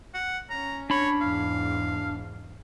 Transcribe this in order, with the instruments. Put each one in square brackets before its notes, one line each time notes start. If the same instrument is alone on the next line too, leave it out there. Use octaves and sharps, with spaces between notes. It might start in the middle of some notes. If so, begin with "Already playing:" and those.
[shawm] F#5
[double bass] C#4 [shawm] A#5
[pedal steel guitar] D4 B5 [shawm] C#5
[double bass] E2 G#2 [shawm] F5